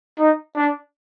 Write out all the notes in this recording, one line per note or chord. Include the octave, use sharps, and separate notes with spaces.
D#4
D4